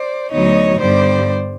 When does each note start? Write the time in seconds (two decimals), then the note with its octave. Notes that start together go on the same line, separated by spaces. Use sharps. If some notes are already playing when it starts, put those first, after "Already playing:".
Already playing: C5 D5
0.32 D2 D3 F#3 B3 D#4 C#5 D#5
0.81 G2 D3 G3 B3 C5 D5